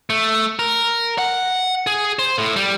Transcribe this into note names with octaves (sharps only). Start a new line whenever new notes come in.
A3
A#4
F#5
G#4
C5
A2
G3